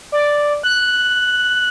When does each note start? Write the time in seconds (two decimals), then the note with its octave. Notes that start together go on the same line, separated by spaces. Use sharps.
0.12 D5
0.63 F#6